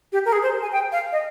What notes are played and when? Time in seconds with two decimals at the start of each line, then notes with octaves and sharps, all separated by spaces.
0.12 G4
0.25 A#4
0.33 G#4
0.43 C5
0.62 G#5
0.72 G5
0.92 F5
1.12 D#5